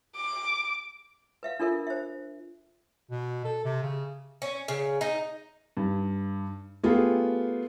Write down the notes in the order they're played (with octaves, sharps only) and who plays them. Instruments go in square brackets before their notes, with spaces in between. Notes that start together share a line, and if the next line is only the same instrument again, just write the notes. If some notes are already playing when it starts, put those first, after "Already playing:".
[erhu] D6
[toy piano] B4 E5 F5
D4 F4 A4 A#4 E5
C5 E5
[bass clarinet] B2
A4
C3
C#3
[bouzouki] C#4
C#3
D#4
[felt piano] G2
A3 B3 F4 G4 G#4